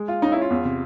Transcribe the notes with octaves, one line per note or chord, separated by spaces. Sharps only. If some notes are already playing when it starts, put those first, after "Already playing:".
Already playing: G#3
F4
C#4 D#4
E4
C#4
F4
E2
C3